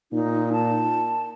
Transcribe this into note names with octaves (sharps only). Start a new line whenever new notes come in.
A#2 D#4
A5